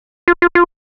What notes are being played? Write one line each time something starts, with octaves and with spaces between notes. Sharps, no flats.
F4
F4
F4